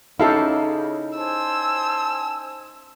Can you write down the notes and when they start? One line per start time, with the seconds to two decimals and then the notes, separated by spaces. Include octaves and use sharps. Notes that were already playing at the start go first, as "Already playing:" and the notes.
0.20 C#3 C#4 D#4 E4 G4 A4 F5
1.17 C5 G#5 A5 E6